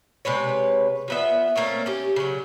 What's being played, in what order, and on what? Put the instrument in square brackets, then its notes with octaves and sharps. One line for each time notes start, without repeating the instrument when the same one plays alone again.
[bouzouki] C3 G#3 B4 C#5
F3 B3 E5
A3 A#3 C4 C#4
C#4 G4
C#3 F#3